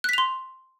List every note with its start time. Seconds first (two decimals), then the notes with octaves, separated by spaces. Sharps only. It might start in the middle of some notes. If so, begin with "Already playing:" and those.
0.04 F#6
0.09 B6
0.13 F7
0.18 C6